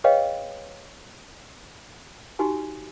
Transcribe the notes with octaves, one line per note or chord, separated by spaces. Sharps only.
G#4 B4 C#5 D#5 F5 G5
D#4 F#4 G4 G#5